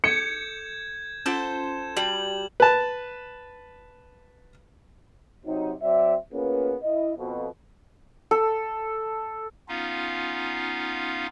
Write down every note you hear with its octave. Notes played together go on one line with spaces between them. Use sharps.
A4 G6 G#6 C#7 E7
C#4 F4 A4 C5 F#5 E7
G3 F#4 A5 F#7
B4 A5
C3 F#3 D#4
F#3 C4 D5 E5
A#3 B3 C#4 F4 G#4 B4
E4 D#5
F2 B2
A4
B3 C#4 D#4 F4 F5